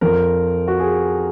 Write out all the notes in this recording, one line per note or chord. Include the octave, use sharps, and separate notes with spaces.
F2 F3 A#4
F#4
G#4